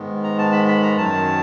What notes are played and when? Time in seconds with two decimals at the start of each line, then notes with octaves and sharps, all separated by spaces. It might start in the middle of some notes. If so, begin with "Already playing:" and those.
Already playing: G#2 D#3 G#3 B3
0.24 A#5
0.39 A5
0.52 B5
0.68 B5
0.83 A#5
0.97 F#2 D#3 F#3 A5